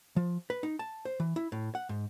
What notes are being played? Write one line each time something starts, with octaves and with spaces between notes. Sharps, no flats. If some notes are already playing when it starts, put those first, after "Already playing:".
F3
B4
D#4
A5
C5
E3
E4
A2
F#5
G#2